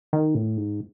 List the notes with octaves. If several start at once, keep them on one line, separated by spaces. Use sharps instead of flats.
D#3
A2
G#2